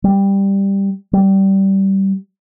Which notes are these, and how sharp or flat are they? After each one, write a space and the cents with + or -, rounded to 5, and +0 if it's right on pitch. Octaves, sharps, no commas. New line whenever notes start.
G3 +5
G3 -20